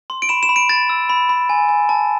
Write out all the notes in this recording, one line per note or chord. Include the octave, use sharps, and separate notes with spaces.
C6
D7
B5 E7
E7
B5
D7
B5 A6
E6
B5
B5
G#5
G#5
A5